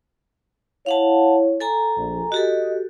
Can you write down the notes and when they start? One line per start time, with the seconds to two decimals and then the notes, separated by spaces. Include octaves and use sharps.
0.86 E4 C#5 F5 F#5 A5
1.60 A4 G#5 A#5
1.97 A#1
2.32 F#4 G4 A4 D#5